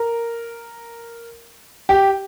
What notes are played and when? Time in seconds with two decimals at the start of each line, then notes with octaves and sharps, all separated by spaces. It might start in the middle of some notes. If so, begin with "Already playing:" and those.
Already playing: A#4
1.89 G4